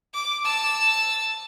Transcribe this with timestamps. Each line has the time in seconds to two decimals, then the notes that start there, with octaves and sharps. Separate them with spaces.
0.13 D6
0.45 A5 E6